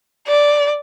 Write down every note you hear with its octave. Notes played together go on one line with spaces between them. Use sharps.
D5